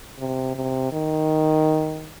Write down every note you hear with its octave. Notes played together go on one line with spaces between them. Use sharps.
C3
C3
D#3